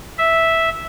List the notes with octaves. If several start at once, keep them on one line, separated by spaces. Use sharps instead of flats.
E5